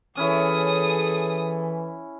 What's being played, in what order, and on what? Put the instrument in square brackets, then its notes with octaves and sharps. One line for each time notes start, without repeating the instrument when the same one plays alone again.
[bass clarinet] E3 [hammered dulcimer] C#4 E4 C#5 [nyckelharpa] G#4 A4 [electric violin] D#6